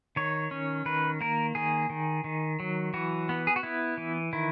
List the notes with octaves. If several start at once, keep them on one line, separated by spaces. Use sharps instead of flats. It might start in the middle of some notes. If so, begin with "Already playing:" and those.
D#3 C#5
C#4
D#3 B4
A#3 A#4
D#3 G#4
D#3
D#3
F#3
E3 F#4
B3
G#4
F#4
B3 E4
E3
D#3 E4